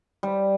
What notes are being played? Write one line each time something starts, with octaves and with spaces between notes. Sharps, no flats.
G3